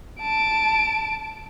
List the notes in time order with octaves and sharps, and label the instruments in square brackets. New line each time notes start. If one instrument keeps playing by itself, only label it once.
[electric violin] A5 D7